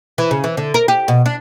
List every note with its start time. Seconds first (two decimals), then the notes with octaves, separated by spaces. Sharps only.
0.18 E3
0.31 C#3
0.44 E3
0.57 D3
0.74 A#4
0.88 G4
1.08 B2
1.26 D4